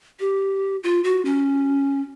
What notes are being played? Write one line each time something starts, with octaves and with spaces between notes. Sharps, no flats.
G4
F4
F#4
C#4